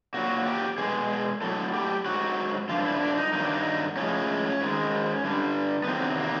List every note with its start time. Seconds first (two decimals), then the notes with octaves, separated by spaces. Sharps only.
0.14 A#2 F#3 F#4
0.46 G4
0.78 B2 G#3 G#4
1.42 A2 F#3 A4
1.74 G4
2.06 G#2 D#3 F#3 F#4
2.69 G2 D3 F3 F4
2.85 E4
3.01 D4
3.17 D#4
3.33 G2 D#3 F#3 D#4
3.44 D4
3.54 D#4
3.97 A2 F3 G#3 C#4
4.61 G#2 D#3 G#3
5.24 G2 D3 G3
5.84 B3
5.87 E2 C3 D#3 F#3 C4
6.20 A#3